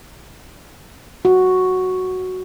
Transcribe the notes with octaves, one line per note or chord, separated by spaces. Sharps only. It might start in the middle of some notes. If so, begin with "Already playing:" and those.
F#4